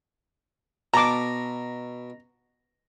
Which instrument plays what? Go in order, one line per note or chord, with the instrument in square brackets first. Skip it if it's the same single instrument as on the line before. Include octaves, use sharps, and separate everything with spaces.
[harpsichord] B2 [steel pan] A5 D6 [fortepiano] A#5